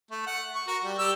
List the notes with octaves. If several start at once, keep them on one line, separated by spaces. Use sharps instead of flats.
A3
F#5
C#6
F#4 A#4
G3
G3 G4 E6